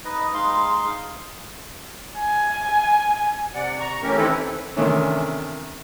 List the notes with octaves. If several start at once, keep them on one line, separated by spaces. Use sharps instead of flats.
D#4 B4 D#5
G#3 D#4 F5 C6
G#5
C3 D5 F#5
A#5 C#6
E3 A3 C#4 G4 A#4
D#3 E3 C4 E4 A4 B4
C3 D#3 E3 A3 C#4 D4